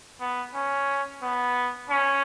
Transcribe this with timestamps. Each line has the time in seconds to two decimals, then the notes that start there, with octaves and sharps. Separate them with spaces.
0.20 B3
0.54 C#4
1.22 B3
1.90 C#4